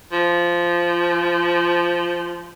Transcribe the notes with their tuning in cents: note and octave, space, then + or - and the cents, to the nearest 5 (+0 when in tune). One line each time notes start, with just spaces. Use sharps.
F3 -10